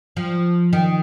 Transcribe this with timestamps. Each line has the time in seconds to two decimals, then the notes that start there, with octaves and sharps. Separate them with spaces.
0.17 F3
0.73 D#3